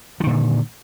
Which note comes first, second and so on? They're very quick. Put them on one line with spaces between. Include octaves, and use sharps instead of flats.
F3 D#3 A#2 D3